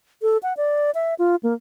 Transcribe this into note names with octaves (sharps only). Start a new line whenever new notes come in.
A4
F#5
D5
E5
F4
A#3